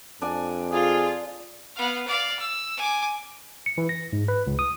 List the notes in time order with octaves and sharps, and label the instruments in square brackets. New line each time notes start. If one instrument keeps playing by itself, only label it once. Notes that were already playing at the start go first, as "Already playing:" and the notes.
[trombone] F2 [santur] D4 D5 G#5
[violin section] F4 [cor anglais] G#4
[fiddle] B3 F5
D5 F5
E6
G#5 D6
[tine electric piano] C#7
E3
A#6
G#2
B4
C#2
D#6